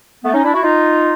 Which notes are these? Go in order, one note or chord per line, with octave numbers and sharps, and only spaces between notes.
A3 B3
C#4 D#4
D4 E4
E4 F#4
D#4 F4